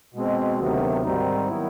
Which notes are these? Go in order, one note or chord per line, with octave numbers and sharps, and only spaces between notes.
B2 G#3 C4
D2 C3 D#3 F#3 B3
G#2 D#3 G3 C4 D#4
D#3 F#3 B3 E4